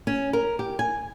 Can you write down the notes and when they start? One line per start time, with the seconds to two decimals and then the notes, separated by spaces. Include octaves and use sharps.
0.07 C#4
0.33 A#4
0.59 G4
0.79 G#5